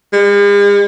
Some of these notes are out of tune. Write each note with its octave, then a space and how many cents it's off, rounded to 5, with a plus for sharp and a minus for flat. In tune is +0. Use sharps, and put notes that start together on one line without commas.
G#3 -45